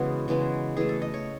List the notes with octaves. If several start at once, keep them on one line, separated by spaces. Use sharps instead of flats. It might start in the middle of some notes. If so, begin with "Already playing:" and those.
Already playing: C#3 E3 G#3 B3 F#4 G#4
C#3 E3 G#3 B3
E3 A3 G#4
A4
D#5
C#5